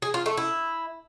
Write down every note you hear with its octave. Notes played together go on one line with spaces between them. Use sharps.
G#4
F4
A3
E4